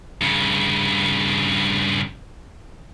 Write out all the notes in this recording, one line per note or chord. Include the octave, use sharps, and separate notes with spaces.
G2 C#3